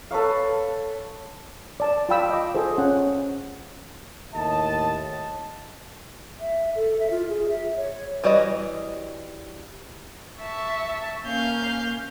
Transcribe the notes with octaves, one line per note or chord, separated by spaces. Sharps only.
A4 B4 C#5 F5
D5 A5
F4 D5 F5 G5 B5 E6
D#5 D6
F4 G#4 A4 C5
C#4 F#5
D#2 A2 D#5 A5
E5
A4
E5
F4
G#4
E5
C#5
E3 G3 F#4 C#5 D#5
E5 A5 C#6
A#3 C#4 F5 G6